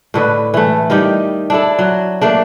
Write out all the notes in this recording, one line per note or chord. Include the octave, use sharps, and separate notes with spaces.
A2 D3 B4
E3 A3
D#3 G3 D#4 G4
D4 E4 A4
F#3
A3 A#3 D4